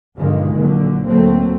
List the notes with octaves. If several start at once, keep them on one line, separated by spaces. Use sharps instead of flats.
G2 B2 D3 D#3 F3 G#3
A#1 A#2 D3 F#3
D2 F#3 A3 A#3 C4